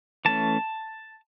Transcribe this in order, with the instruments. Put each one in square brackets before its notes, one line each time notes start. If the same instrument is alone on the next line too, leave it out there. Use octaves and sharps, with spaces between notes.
[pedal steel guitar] E3 A3 C#4 A5